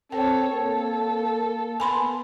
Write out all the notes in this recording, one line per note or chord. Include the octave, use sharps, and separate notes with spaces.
C4 A4 C#5 G5
A#3 A4
B3 G#5 B5 C6